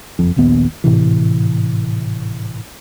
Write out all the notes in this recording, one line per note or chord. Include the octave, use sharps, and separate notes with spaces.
F#1 F2
D#1 A#1 D#2 B3
G#1 A2 C3 E3